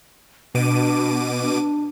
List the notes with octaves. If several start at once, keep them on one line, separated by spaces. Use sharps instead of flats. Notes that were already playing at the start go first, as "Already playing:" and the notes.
B2 D4 D6 D#7
D4